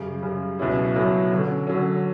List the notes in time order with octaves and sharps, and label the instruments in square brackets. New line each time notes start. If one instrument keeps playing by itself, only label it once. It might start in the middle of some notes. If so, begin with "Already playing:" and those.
Already playing: [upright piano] F#2 C#3 G3
F#2 C#3 G3
C#2 B2 F#3 C#4 E4
C#2 B2 F#3 C#4 E4
D3 F#3 C#4
D3 F#3 C#4